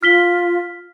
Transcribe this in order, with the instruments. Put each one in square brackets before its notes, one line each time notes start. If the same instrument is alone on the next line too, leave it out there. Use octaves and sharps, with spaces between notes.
[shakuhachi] F4 [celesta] F6 B6 G7